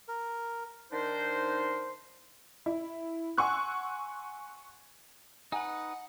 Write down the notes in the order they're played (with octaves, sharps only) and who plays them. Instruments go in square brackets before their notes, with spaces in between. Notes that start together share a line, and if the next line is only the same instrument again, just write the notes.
[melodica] A#4
[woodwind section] D#3 D4 D#4 A#4 C5
[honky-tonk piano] E4
F#5 G#5 C6 C#6 E6 F#6
[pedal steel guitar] D#4 B4 [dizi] F#5 [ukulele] G#5 A#5